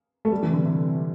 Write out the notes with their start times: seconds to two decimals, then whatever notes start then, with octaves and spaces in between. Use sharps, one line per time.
0.25 A3
0.32 G3
0.43 E3
0.48 C3
0.53 D3
0.65 C3